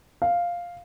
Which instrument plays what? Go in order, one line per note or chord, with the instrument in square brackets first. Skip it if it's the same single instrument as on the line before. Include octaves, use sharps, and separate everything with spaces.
[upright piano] F5